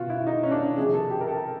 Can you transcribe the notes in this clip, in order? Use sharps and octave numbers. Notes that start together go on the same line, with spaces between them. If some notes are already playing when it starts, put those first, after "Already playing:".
Already playing: B2 F4 F#4
E4
D#4
C#4
D4
C3 F3 G#4
A4
G4
A#4
A4